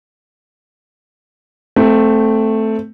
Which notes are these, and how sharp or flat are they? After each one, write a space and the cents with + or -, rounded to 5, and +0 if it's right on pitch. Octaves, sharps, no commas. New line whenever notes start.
A3 +0 C4 -10